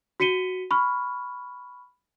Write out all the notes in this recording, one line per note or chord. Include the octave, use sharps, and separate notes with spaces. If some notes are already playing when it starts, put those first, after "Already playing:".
F#4 B6 C#7 D#7 G7
B5 C#6 F6